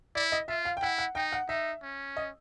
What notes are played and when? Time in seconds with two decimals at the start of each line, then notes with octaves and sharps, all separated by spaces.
0.15 E4 D5
0.32 D#5
0.48 F4 E5
0.65 F5
0.77 G5
0.82 E4 F#5
0.98 F#5
1.15 D#4 G5
1.32 F#5
1.49 D#4 E5
1.82 C#4
2.17 D#5